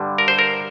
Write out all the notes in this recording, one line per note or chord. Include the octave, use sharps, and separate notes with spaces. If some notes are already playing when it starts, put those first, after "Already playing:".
Already playing: G2 D3 G3
A#4
C5
A#4